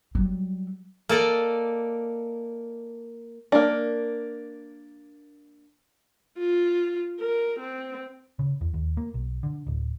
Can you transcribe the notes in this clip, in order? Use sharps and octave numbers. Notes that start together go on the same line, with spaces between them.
F#3 G3
A#3 A4 D5 D#5
A#3 D4
F4
A#4
C4
C#3
E2
D#2
A#3
B1
D3
D1